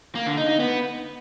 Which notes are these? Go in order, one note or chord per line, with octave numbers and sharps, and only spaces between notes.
A#3
D3
D#4
D#4
B3